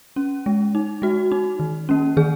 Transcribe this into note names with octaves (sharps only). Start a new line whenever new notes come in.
C#4
G#3
D#4
G#3 F#4
D#4
D#3
A#3 C#4
D#3 G#4